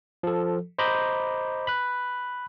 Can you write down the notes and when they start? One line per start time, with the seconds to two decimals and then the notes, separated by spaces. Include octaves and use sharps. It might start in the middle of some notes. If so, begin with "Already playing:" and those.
0.23 F3 A4
0.79 C5 D#5 A#5 B5 D6 G6
1.67 B5 F#6